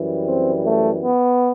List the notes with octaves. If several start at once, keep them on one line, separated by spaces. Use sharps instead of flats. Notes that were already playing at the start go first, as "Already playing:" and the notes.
Already playing: F#2 E3 G3
C4
A3
B3